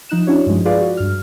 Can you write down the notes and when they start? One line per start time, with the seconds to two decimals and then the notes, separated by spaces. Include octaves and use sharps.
0.09 F3 D#4 F#6 E7
0.27 C#4 D4 E4 F#4 C#5
0.47 G2 F3 G#3
0.65 F4 G#4 B4 D5 F5
0.81 F#4
0.97 G2 F6